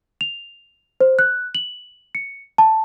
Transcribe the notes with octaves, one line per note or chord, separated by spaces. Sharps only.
F7
C5
F#6
F#7
C#7
A5